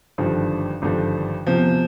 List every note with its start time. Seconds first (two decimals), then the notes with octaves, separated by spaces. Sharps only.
0.18 G#1 G2 D3 F3
0.82 G#1 G2 D3 F3
1.47 E2 C3 F3